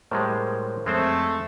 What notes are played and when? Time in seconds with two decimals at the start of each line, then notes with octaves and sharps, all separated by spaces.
0.11 A2 G3 G#3 A#4 C5 C#5
0.86 F2 G#3 A3 C4 C5